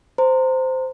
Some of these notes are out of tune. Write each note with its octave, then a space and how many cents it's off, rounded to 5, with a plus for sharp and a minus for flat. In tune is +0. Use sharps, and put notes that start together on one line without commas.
C5 -10 A#5 -25